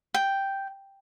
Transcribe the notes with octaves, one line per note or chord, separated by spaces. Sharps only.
G5